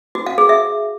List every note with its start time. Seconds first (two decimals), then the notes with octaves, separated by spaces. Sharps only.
0.15 F#4
0.26 F5
0.38 G#4
0.49 E5